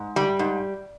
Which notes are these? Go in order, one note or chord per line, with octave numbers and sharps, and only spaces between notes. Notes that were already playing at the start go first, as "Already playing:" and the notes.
Already playing: G#2
G3
G#2